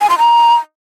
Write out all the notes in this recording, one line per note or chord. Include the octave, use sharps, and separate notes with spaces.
G#5
C6
A#5